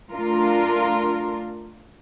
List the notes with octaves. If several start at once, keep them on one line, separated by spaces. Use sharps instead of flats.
A3 D4 F4 A#4